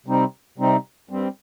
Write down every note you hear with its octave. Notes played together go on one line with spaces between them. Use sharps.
C3 G3 C4 D#4
C3 G3 C4 D#4
G2 G3 C4